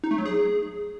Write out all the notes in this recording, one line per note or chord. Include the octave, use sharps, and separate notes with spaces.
D#4
A3
F#3
G#4